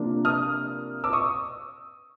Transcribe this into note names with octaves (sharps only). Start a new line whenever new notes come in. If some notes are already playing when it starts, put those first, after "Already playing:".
Already playing: C3 F3 A#3 D4
D#6 F6
D6 E6
C#6 D#6